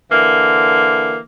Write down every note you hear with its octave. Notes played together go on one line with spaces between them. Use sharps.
D3 E3 A#3